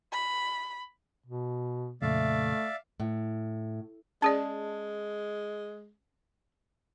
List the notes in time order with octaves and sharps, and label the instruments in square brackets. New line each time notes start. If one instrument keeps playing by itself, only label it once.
[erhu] B5
[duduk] B2
[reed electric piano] F2 A#2 C#3 [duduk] A3 [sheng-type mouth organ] D5 E5 F5
[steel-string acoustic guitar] A2
[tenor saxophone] G#3 [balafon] C#4 G#4 D5 [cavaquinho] A5